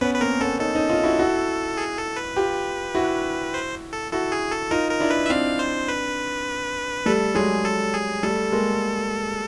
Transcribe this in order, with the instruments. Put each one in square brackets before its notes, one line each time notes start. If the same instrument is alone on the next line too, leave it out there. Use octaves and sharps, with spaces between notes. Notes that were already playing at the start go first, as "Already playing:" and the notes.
[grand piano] B3 C#4 [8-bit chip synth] B4
[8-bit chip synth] B4
[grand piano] A#3 C4 [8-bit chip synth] A#4
[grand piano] B3 C#4 [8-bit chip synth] A4
[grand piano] C#4 D#4 [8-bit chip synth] A4
[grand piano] C#4 D#4
D#4 F4
E4 F#4
E4 F#4
[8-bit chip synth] G#4
A4
B4
[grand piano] F4 G4
E4 F#4
[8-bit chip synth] C5
A4
[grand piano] E4 F#4 [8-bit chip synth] A4
[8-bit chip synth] G#4
A4
[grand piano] D#4 F4 [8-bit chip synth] A#4
[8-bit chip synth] A#4
[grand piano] D4 E4
[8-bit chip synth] B4
E5
[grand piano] C4 D4 [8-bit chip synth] F5
[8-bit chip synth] C5
B4
[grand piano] G3 A3 [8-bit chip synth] A4
[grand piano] F#3 G#3 [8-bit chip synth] G#4
[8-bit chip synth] A4
G#4
[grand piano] G3 A3 [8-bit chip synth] A4
[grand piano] G#3 A#3